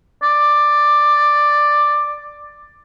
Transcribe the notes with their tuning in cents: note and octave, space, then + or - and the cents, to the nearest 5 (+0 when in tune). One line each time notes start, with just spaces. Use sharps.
D5 +10